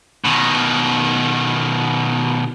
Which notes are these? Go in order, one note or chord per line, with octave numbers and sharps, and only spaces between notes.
B2 D#3